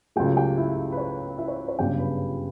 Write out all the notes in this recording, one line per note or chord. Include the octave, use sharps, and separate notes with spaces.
C#2 C#3 F#3 A3 G4 G5
G4 G5
E4 E5
B4
C#5
E4 E5
C#5
C#5
G1 F#2 C#3 G3 D4 G4 G5
B4 B5